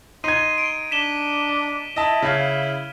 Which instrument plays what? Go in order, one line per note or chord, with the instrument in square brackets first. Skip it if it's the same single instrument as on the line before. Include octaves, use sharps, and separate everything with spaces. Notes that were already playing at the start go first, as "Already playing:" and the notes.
[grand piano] D#4 G#6 [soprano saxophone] C6 [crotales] D#7
[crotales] D7
[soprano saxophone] D4 [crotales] B6 E7 G7
[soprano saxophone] E4 [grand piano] D#5 E5 A5
[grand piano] C#3 F5 G#6 [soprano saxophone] E4 [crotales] F6